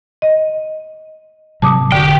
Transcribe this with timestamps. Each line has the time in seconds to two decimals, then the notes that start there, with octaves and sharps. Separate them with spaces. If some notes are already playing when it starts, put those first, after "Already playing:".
0.22 D#5
1.62 G#2 C3 F#3 A5 D6 D#6
1.92 E1 D3 F#4 G4 G5